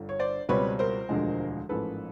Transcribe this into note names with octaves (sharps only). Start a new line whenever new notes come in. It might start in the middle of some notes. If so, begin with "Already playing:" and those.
Already playing: G1 G2 D3
C#5
C5 D5
C#2 B2 G3 C4 B4 C#5
A#4 C5
E1 D2 D3 F3 G#3
A1 G#2 F3 A#3 C#4 A4 B4